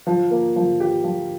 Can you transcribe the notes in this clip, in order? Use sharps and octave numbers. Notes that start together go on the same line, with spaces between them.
F3
A#3
F3
G4
F3